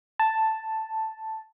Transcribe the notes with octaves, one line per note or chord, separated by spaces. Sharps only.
A5